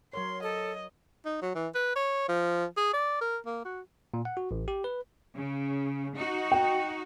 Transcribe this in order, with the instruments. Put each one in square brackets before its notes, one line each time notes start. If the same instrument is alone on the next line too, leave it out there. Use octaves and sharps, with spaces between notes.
[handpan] F#3 A#4 C#5 [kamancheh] C6
[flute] A4 [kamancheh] D#5
[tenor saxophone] D#4
F#3
E3
B4
C#5
F3
G#4
D5
A#4
A#3
F#4
[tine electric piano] A#2
F#5
F#4
A1
G4
B4
[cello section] C#3
D#4 F#4
[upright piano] G5